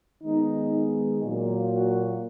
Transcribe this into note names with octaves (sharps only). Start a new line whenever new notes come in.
D#3 G#3 B3 D#4
A#2 F#3 A#3
F#4